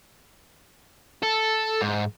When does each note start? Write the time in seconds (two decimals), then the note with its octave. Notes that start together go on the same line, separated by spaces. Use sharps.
1.22 A4
1.81 G#2